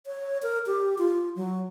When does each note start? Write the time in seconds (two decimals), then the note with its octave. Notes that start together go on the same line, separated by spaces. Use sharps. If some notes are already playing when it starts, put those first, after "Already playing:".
0.06 C#5
0.43 A#4
0.66 G4
0.98 F4
1.36 F#3